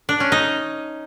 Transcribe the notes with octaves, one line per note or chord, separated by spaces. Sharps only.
D4
C#4
D#4